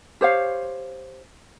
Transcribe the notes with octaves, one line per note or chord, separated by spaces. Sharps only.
G4 C5 C#5 F5